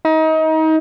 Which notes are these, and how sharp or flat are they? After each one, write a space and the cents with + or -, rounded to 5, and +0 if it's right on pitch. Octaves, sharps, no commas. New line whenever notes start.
D#4 +30